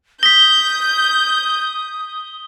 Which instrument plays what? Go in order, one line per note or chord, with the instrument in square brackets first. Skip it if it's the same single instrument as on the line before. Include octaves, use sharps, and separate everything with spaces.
[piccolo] D#6 [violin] G6 [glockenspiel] A#6 B6 [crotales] G7